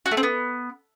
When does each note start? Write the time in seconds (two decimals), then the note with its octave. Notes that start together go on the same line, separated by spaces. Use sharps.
0.06 F#4
0.11 A3
0.17 C4
0.23 B3